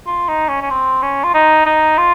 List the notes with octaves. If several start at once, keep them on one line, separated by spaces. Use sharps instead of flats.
F4
D#4
C#4
C#4
C4
C#4
F4
D#4
D#4
F4